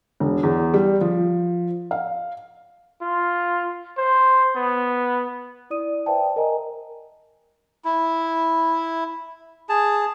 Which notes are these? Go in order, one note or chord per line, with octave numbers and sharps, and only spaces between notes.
E1
E2
G3
F3
F5
F4
C5
B3
E4 D5 D#6 D#7
B4 C5 D5 E5 G5 A5
A#4 D#5 G#5 A#5
E4
G#4 A5